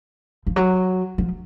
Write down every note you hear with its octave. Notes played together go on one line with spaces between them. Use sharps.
F3
F#3
F3